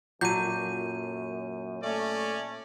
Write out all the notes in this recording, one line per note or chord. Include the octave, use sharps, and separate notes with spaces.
F#2 A#2 F#3 A4 G6 D#7
A3 C#4 C#5 D5